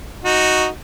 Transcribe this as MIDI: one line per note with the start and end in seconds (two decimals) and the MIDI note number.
0.24 0.68 63
0.24 0.68 66